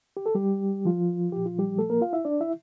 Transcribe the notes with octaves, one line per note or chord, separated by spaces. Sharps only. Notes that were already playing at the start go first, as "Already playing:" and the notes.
G4
A4
G3 G4
F3 F4
A#2 F3 G4
F4
G3 G4
A3 A4
A#3 A#4
F4 F5
E4 E5
D4 D5
E4 E5